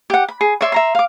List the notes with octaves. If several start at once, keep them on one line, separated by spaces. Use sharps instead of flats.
G4 F#5
B5
G#4
C#5 D5 E5 C6
E5 A#5 C6
F5 D6